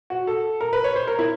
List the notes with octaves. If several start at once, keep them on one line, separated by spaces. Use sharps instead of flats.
F#4
A4
A#4
B4
C#5
C5
A#4
E4